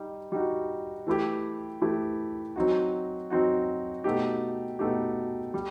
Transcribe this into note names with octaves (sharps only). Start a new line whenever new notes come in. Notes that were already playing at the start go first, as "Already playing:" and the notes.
Already playing: G3 D#4
G3 D#4 F#4
E3 A3 E4 G4
E3 A3 E4 G4
F#3 C4 D#4 F#4
F#3 C4 D#4 F#4
B2 A3 D#4 G4
B2 A3 D#4 G4
G3